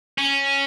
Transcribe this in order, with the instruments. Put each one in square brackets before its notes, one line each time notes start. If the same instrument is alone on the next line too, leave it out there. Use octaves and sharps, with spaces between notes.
[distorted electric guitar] C#4